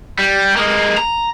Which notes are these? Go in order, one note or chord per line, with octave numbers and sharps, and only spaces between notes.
G3
G#3 A#3
A#5